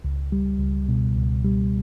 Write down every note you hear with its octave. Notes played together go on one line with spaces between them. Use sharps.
C#2
G3
C#2
B2
C#2
G3